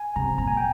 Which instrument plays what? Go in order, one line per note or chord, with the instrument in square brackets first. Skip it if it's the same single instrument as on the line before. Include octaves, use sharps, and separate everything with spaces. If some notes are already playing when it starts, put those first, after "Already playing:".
Already playing: [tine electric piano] G#5
[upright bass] C3 [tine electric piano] A#5
[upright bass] A#2 [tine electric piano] A#5
[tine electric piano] G#5
G5